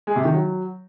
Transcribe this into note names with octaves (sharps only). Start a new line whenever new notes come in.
G#3
C3
D#3
F#3